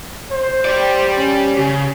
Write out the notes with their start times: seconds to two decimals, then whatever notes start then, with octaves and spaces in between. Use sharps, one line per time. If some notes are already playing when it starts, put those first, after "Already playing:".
0.31 C5
0.65 G4 D5
1.17 C#4
1.58 C#3